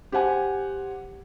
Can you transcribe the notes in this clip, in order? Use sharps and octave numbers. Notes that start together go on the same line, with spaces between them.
G4 C5 F#5 G#5